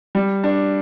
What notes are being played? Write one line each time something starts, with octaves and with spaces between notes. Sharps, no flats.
G3
D4